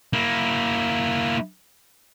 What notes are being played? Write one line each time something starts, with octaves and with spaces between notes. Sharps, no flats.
A#3 E4